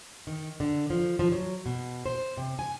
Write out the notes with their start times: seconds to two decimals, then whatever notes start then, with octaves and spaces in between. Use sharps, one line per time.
0.27 D#3
0.60 D3
0.90 F3
1.19 F3
1.32 F#3
1.66 B2
2.06 C5
2.37 C3
2.59 G#5